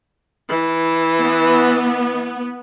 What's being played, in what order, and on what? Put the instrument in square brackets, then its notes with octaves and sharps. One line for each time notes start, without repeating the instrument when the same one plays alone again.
[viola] E3
[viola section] B3